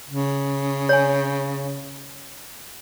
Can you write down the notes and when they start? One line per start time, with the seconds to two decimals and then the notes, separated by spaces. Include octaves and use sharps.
0.10 C#3
0.89 C#5 G#5